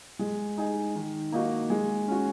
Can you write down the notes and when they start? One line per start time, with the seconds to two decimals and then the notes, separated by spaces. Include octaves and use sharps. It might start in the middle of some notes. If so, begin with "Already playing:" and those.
0.19 G#3
0.58 D#4 G#4
0.95 D#3
1.32 A#3 D#4 F#4
1.70 G#3
2.08 C#4 F#4